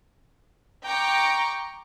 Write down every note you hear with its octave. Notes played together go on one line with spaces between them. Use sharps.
G5 A#5 C#6 D6